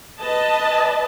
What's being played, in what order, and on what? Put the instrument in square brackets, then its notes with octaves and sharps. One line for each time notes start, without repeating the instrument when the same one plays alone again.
[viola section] B4 D#5 A5